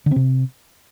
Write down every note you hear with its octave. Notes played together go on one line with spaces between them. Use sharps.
D3
C4
C3